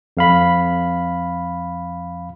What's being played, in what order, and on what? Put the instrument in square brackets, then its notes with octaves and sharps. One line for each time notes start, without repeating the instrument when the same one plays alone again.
[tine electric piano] F2 F5 B5